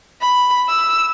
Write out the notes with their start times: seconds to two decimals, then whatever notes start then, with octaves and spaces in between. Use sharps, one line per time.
0.21 B5
0.69 E6